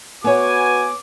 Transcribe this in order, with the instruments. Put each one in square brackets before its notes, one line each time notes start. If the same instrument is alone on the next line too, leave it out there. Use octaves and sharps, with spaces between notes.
[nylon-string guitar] B3 C#5 [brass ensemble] F#4 B4 G#5 [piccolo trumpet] D6